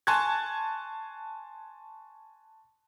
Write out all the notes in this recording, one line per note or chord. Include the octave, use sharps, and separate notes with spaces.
G#5 A5 C6 C#6 F#6 G#6